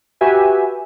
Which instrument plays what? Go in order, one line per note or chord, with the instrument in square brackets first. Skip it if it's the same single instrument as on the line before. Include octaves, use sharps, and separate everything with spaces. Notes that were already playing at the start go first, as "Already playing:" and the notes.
[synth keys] F#4 G4 B4 E5 G#5